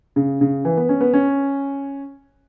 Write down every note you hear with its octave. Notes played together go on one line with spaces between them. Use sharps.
C#3
C#3
E3
B3
C#4
B3
C#4